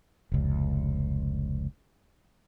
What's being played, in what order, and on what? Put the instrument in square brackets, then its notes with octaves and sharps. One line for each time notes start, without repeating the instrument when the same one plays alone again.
[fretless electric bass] F1 C#2